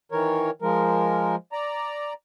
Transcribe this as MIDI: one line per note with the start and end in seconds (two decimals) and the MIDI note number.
0.12 0.50 51
0.12 0.50 52
0.12 0.50 70
0.12 0.50 73
0.62 1.35 53
0.62 1.35 56
0.62 1.35 70
1.52 2.13 74
1.52 2.13 82